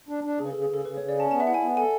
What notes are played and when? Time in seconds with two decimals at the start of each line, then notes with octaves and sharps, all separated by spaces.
0.09 D4
0.24 D4
0.39 C#3 G#4
0.45 B4
0.51 C#3 A4
0.62 G#4
0.69 C#3 A4
0.85 C#3 B4
0.97 C#3 C#5
1.09 D5
1.16 C#4 A5
1.31 B3 A5
1.40 E5
1.47 E4 F#5
1.54 G#5
1.62 B3
1.77 A4 G#5